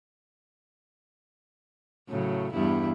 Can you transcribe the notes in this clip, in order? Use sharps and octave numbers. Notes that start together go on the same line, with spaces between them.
A2 C#3 F#3
E2 G2 E4